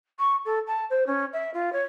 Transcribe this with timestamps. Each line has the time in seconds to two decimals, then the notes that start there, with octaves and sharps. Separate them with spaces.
0.19 C#6
0.45 A4
0.67 A5
0.90 C5
1.06 C#4
1.33 E5
1.54 F4
1.72 C#5